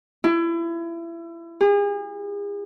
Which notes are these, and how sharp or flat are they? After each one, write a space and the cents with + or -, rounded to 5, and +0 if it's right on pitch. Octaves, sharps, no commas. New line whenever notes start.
E4 +30
G#4 -40